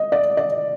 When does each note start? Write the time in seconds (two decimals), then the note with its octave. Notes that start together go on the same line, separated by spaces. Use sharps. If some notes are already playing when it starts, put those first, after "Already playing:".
Already playing: D#5
0.12 D5
0.37 D5